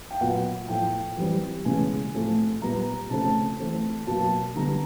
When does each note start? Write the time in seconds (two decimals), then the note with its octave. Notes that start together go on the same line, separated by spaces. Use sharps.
0.11 G5
0.21 A#2 F#3 B3 F#5
0.68 A2 F3 A3 G5
1.17 E3 G3 C4
1.65 C#3 E3 G#3 B3 G#5
2.14 A2 F3 A3 C4
2.62 A#2 G3 B3 A#5
3.10 C#3 F3 A3 C4 A5
3.59 E3 A3 C4
4.07 B2 F#3 A#3 A5
4.56 D3 G3 B3 A#5